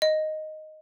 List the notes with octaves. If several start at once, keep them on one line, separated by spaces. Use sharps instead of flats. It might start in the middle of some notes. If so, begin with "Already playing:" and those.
D#5